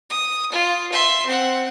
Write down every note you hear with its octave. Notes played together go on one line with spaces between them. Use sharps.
D#6
F4
E5 C6
C4 F#5